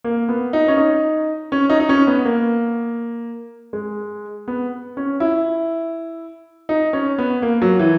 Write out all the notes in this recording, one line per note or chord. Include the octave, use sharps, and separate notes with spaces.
A#3
B3
D#4
C#4
D#4
C#4
D#4
D#4
C#4
B3
A#3
G#3
B3
C#4
E4
D#4
C#4
B3
A#3
F#3
E3